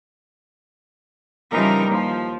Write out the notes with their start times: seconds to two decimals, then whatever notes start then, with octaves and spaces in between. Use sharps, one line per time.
1.51 C#3 E3 F3 G3 D#4 A#4
1.88 D#2 F3